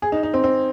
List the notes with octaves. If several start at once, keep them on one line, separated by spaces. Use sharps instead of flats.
G#4
D#4
D#4
C4
C4